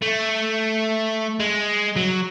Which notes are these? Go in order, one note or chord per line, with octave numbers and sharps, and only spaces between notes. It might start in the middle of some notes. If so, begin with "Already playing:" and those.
A3
G#3
F#3